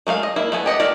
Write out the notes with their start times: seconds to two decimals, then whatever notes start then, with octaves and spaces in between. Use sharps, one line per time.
0.07 G#3 A3 B4 F5
0.23 D#5
0.36 A#3 E4
0.52 A3 B3 G#5
0.66 G4 D#5 F#5
0.80 A3 B3 A#4 D5